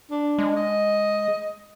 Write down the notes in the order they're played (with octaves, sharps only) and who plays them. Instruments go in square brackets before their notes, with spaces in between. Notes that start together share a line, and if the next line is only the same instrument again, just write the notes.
[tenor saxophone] D4
[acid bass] G#3
[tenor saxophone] D#5